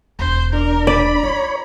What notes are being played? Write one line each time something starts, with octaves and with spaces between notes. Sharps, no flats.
E1 C5
D4 A#4
D5 B5
F4 C#5